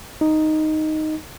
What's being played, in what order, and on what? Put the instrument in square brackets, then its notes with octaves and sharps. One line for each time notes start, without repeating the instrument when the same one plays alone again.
[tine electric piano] D#4